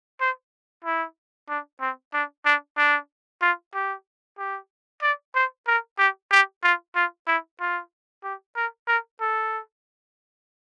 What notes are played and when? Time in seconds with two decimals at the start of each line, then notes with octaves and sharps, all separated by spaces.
0.20 C5
0.85 E4
1.49 D4
1.80 C4
2.13 D4
2.45 D4
2.77 D4
3.41 F4
3.74 G4
4.38 G4
5.02 D5
5.35 C5
5.67 A#4
5.98 G4
6.31 G4
6.63 F4
6.95 F4
7.27 E4
7.60 F4
8.24 G4
8.56 A#4
8.87 A#4
9.21 A4